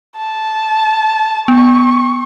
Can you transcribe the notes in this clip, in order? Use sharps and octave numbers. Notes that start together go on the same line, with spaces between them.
A5
B3 C#6